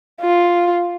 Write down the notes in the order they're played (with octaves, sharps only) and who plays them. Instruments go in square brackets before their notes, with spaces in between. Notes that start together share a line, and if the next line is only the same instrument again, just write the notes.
[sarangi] F4